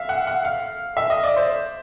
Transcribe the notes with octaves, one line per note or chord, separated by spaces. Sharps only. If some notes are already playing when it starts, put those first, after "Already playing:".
Already playing: E5 F5
F#5
F#5
F5
E5
D#5
D5
C5